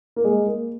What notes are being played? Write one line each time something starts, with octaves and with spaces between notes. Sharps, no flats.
A#3
G#3
A#3